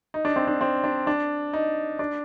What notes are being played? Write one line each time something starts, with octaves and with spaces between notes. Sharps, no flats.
D#4
D4
C4
D4
C4
D4
D4
D#4
D4